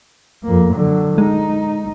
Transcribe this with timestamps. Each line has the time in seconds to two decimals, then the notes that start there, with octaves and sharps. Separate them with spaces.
0.44 F2 A#3
0.74 D3 F#3
1.18 G#3 D#4